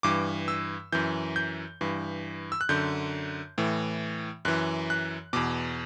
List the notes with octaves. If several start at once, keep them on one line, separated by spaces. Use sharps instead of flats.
G2 E3 D6
E6
F#2 E3 G6
G6
G2 E3
E6
F#6
F#2 D3 G6
A2 E3
F#2 E3 F#6
F#6
E2 B2 D6